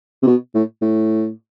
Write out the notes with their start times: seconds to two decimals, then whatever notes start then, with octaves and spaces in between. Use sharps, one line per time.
0.23 C3
0.27 B2
0.55 A2
0.82 A2